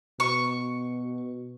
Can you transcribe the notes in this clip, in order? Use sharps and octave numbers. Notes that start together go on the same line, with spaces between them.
B2 C#6